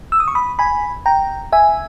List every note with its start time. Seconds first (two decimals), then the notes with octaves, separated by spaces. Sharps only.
0.12 E6
0.20 D#6
0.28 C#6
0.35 B5 D#6
0.59 G#5 B5
1.06 G5 A#5
1.53 E5 G#5